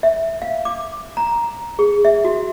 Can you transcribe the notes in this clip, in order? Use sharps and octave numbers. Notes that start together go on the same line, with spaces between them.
E5
F5
D6
A#5
G#4
E5
F#4